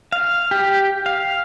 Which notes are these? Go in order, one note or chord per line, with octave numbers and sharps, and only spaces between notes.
F5
G4
F5